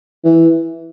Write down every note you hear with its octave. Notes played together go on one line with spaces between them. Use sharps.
E3